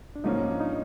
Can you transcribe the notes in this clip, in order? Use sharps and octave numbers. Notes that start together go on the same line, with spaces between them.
D4
G#2 F3 A#3 C#4 D#4
D4
D#4